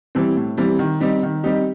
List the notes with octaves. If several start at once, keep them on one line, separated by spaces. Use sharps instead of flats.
E3 G3 C4
A2
E3 G3 C4
D#3
G3 C4 D#4 G4
D#3
G3 C4 D#4 G4